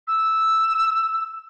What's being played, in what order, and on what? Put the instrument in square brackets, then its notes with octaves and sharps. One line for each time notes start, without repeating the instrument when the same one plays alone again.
[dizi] E6